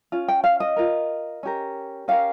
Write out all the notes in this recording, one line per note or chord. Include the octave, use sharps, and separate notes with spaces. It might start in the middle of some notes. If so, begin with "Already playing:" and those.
C#4 F4
G5
F5
D#5
F4 A#4
C#4 G4 A#4
C#4 G4 A#4 F5